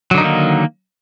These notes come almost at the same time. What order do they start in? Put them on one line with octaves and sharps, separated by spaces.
F#3 D3 D#4 D#3 A#3